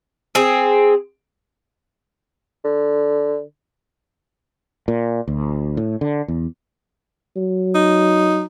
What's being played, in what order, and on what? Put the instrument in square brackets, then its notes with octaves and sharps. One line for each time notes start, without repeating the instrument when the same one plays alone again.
[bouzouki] C4 G#4
[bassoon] D3
[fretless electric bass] A#2
D2
A2
D3
E2
[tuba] F#3
[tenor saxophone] D#4